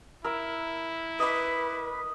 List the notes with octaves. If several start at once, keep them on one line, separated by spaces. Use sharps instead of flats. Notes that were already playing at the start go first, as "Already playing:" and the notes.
E4 A#4 E6
B4 D#5 D6